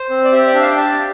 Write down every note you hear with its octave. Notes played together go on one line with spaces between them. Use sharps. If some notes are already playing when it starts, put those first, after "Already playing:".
Already playing: C5
C4
D5
G4 E5
D5
D4 E5
F5
G5
G4 A5